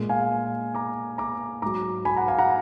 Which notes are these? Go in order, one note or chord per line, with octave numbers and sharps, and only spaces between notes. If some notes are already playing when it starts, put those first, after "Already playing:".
Already playing: A#2 G#3
F5 G#5
A#5 D6
A#5 D6
G#2 F#3 A#5 D6
G#5 B5
F#5 A#5
F5 G#5
F#5 A#5